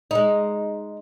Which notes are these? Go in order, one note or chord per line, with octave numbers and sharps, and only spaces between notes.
G#3 D#4